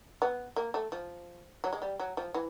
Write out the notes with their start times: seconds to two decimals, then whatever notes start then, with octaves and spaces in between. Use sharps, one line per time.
0.22 B3
0.56 A#3
0.74 A3
0.92 F3
1.64 F#3
1.73 G#3
1.82 G3
2.00 F#3
2.17 F3
2.34 E3